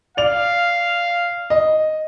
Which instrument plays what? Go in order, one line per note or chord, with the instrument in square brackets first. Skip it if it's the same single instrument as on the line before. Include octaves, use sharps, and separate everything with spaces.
[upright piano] D5 F7 [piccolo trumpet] F5
[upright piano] D#5